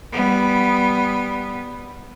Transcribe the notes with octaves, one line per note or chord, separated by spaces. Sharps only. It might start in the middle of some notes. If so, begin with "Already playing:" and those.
G3 B3